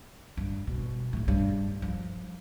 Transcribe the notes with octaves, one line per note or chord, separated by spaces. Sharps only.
G2
B2
C#2 A2
G2
F3